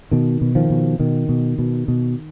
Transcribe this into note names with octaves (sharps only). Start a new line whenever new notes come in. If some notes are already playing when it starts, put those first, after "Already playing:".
B2 D#3
B2
D#3 F3
B2
B2 D#3
B2
B2
B2